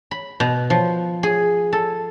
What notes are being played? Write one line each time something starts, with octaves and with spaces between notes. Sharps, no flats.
B5
B2
F3
G#4
A4